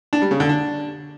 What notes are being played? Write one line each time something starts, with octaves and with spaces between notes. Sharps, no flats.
D4
G3
C#3
D3
D4